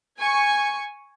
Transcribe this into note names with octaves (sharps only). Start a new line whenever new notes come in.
G#5 C#6